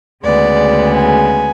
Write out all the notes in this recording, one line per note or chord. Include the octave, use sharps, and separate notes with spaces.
D2 C#3 G#3 B3 D5
G#5